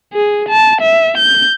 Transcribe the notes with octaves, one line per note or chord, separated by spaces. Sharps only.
G#4
A5
E5
G6